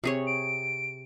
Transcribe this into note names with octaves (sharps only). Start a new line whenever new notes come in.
C3 G#4 C#5
D7